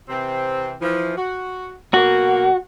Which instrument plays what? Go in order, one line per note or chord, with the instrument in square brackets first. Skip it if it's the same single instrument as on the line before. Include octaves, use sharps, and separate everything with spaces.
[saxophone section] C3 E3 C4
E3 F3
F#4
[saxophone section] B2 F#3 A#3 [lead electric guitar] F#4